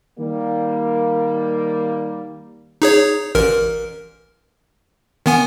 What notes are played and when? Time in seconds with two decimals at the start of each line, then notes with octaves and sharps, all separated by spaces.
0.19 D#3 G3 A#3
2.82 D#4 G#4 C#5
3.35 A1 A#4
5.26 D#3 B3 G#5